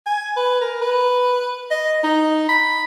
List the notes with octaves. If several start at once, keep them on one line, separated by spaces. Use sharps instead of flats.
G#5
B4
A#4
B4
D#5
D#4
B5